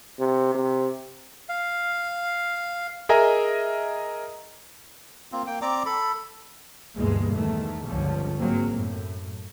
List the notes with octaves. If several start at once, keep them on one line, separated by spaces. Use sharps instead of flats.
C3
C3
F5
G#4 A#4 D#5 E5 G#5 A#5
A#3 C4 F4
A#3 G5
C4 D5 A#5 D6
A4 B5
D2 G2 B2 E3 G#3 A#3
E2 D#3 A3
G1 C#2 D3 F3 C#4
G#2 F#3 G#3 A#3 C4
F#2 A2